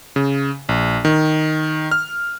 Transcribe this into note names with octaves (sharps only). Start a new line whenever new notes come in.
C#3
A#1
D#3
F6